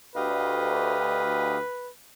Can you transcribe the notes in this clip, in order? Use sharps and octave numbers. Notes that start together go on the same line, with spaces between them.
D2 G4 B4 D#5 F5